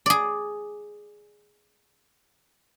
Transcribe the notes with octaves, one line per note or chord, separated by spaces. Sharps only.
G#4 D5